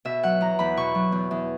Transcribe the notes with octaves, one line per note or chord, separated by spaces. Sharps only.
B2 E5
F#3 F#5
E2 A#5
E2 B5
B2 C#6
F#3
E2
E2